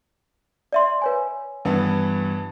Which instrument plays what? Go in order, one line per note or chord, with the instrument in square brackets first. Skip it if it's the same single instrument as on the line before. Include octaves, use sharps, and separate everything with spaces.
[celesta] D5 E5 C6
B4 C#5 G#5
[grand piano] G2 E3 B3